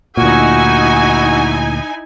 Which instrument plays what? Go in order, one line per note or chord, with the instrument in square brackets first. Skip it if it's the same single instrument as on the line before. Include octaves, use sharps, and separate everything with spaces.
[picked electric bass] D2 A#2 [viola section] D#4 E4 G#5 [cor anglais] F#4